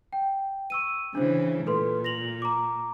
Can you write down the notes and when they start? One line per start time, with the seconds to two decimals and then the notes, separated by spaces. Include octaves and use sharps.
0.13 G5
0.70 C#6 E6 D#7
1.15 C#3 E3 D4 C5
1.67 A#2 A4 B4 C6
2.04 A#6 F7 F#7
2.42 A#5 D6